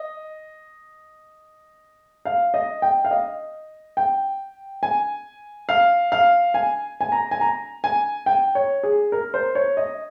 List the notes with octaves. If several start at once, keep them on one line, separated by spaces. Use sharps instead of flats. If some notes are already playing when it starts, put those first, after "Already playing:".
Already playing: D#5
F5
D#5
G5
F5
D#5
G5
G#5
F5
F5
G#5
G#5
A#5
G#5
A#5
G#5
G5
C#5
G#4
A#4
C5
C#5
D#5